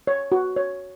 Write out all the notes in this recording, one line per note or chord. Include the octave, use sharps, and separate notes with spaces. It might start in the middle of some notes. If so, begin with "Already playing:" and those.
C#5
F#4
C#5